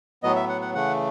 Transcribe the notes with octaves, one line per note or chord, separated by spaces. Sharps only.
A2 F#3 B3 D#5
E5
F#5
F#5
C#3 E3 A3 F#5